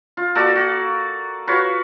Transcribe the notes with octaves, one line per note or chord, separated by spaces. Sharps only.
F4
A#3 F#4 A4 D5
F#4
F4 F#4 B4 C#5